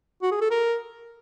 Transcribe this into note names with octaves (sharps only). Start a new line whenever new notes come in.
F#4
G#4
A4
A#4